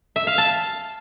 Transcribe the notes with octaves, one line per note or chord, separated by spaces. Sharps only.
E5
F5
A5